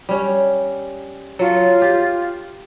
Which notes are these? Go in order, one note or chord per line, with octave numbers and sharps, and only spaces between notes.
G3 C#4
F#3 F4 A4
G4